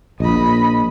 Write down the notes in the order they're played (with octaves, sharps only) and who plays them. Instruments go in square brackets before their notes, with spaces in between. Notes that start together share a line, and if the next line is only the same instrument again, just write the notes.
[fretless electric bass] A#1 [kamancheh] D#5 B5